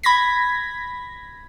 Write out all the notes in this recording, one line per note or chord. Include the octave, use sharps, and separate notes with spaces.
B5 G#6 A#6 B6